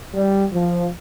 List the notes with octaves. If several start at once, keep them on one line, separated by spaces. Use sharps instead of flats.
G3
F3